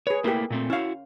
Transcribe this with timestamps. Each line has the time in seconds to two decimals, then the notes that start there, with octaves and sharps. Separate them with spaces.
0.07 G#4 B4 C#5
0.24 A3 A#3 E4 G4 A#4
0.50 A#2 A3 C4
0.70 C#4 E4 F#4 F5